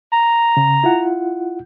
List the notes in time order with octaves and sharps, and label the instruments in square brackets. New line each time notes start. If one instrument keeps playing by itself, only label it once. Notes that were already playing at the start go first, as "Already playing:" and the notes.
[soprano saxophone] A#5
[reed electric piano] C#3
E4 F4 F#5